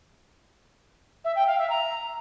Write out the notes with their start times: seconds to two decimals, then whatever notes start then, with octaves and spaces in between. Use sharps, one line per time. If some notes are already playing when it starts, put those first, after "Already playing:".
1.24 E5
1.35 G5
1.47 F5
1.58 E5
1.69 A#5